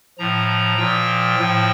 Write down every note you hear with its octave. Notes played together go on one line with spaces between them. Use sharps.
A2 F3 A#5
A#5
A#2 F3 G5
A2 F3